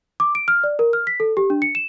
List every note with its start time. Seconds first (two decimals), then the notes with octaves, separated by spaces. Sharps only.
0.20 D6
0.35 D7
0.48 F6
0.64 D5
0.79 A#4
0.93 F6
1.07 B6
1.20 A4
1.37 G4
1.50 D4
1.62 C#7
1.75 E7